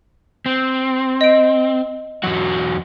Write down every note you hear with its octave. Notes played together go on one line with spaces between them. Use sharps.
C4
D#5 D7
E2 F#3 F#4